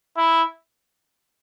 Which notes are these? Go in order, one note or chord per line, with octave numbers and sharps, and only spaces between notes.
E4